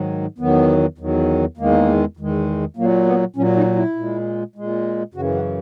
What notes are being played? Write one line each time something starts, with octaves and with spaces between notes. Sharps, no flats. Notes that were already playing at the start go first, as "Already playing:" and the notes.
Already playing: G#2 D#3 F#3
E2 D#3 F#3 B3
E2 D#3 F#3
E2 D#3 G#3 A#3
E2 D#3 G#3
A#2 F#3 A#3
B3
A#2 F#3 C#4
D#4
E4
A#2 G#3
A#2 G#3
F#2 C#3 E3 F#4
F#4